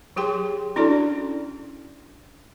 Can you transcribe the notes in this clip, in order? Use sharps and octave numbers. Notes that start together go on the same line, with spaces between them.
F#3 G4 G#4 G5 C6
C#4 D4 E4 F#4 A4 D5